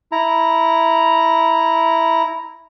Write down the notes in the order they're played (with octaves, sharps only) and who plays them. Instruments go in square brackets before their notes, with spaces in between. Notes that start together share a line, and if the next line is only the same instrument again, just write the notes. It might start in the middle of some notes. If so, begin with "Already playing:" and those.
[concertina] E4 A#5